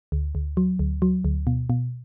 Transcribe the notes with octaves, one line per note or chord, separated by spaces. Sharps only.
D2
D2
F#3
D2
F#3
D2
B2
B2